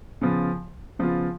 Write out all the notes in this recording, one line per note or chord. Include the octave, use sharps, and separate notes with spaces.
C#3 F3 B3 F4
C#3 F3 B3 F4